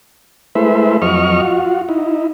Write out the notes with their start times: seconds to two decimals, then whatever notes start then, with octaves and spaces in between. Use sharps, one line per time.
0.55 G#3 A3 E4 B4 C5 E5
1.02 F2 F#3 D#5 C#6 F6
1.41 F4 F#4
1.89 D#4 E4